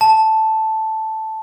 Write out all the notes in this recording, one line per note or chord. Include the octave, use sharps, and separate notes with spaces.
A5